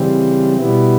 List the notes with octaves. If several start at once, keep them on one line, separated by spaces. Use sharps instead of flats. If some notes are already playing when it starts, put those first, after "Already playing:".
Already playing: C#3 E3 G3 C4
B2 G3 B3 E4